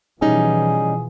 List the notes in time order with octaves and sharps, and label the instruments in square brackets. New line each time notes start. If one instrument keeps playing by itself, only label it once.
[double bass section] B2 E3 F3 [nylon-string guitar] G3 C#4 D#4 [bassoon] G#4